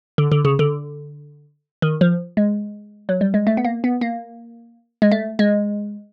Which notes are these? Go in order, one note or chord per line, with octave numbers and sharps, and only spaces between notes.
D3
D3
C#3
D3
D#3
F3
G#3
F#3
G3
G#3
A3
B3
A#3
B3
A#3
G#3
A3
G#3